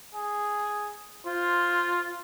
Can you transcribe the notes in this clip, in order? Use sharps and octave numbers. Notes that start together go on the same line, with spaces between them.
G#4
F4 C5